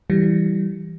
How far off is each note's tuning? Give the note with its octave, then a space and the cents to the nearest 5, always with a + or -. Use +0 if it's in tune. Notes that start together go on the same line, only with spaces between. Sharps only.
E3 +0 G3 -10